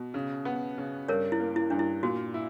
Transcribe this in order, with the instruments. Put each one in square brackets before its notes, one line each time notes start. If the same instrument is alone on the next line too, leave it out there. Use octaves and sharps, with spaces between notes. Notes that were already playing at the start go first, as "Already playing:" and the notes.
Already playing: [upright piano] B2
C#3
B3
C#3
[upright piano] G2 [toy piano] A#4 C#5
[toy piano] E4
[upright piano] A#3
[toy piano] E4
[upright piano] G2 [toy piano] D4
[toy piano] E4
[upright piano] A#2 [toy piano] F#4
[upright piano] E4